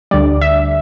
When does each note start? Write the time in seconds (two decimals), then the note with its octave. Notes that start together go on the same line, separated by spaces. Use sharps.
0.11 D2 D3 G3 D5
0.41 E5